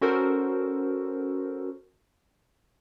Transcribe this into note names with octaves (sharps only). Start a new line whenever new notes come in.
C#4 F#4 A4 A#4 C5